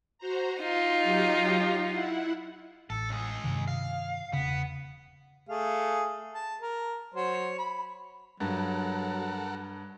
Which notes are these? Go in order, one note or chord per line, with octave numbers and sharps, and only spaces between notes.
F#4 C5 A#5
D#4 F4 C6
F#3 G4
E4 F#5
A1 A4
C#2 G#4
G2 C3 D#3
F5
E1 C#3 B3
A3 G#4 F5
A5
A#4
F#3 C5 C#5
B5
G2 F#3 A4 A#4 F#5